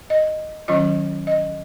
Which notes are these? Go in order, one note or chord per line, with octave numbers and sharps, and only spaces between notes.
D#5
D#3 F#3 C#4 F4 D#5
D#5